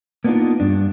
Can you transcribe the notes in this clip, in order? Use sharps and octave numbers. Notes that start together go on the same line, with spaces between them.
A#3 B3 D4 D#4 F4 A#4
G2 D4